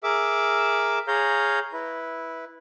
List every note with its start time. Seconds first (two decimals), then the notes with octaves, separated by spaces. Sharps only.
0.04 G#4 A#4 E5 D6 E6
1.08 G#4 C#5 F5 A#5 G6
1.73 E4 B4